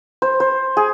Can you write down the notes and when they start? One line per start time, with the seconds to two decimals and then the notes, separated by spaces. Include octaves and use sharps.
0.22 C5
0.40 C5
0.77 G#4